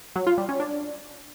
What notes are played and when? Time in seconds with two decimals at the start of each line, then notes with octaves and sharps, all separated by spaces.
0.16 F#3
0.27 F4
0.38 G3
0.49 C#4
0.60 D4